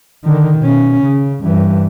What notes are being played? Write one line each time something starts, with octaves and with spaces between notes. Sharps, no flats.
D3 D#3
B2 C#4
C#3
G2 E3